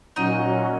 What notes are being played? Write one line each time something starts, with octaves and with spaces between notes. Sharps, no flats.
A#2 F#3 C#4 D#4 F#4 D#5